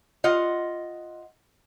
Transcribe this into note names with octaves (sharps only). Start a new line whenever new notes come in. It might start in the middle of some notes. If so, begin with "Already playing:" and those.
F4 D#5 F#5